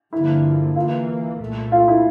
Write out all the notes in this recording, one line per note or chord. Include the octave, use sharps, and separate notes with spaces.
G2 D3 F3 A#3 E4
E2 E3 A#3 F4
C2 A#2 A3
F4
E4